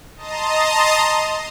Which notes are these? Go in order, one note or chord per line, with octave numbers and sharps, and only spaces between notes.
D#5 A5 A#5 C6 D#6